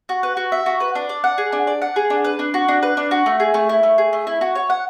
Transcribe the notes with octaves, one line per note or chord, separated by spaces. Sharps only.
F#4
B4
F#4
E5
F#4
B4
D4
D5
F#5
G#4
D4
D5
F#5
G#4
D4
B4
D4
F#4
D4
B4
D4
F#4
A3
G#4
A3
E4
A3
G#4
A3
E4
F#4
C#5
F#5